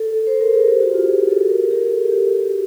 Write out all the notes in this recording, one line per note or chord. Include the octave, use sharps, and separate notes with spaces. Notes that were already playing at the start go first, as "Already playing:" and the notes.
Already playing: A4
C5
A#4
G#4
G4
F#4
F4
G#4
A4
A#4
G4
G#4
A4
G4
F#4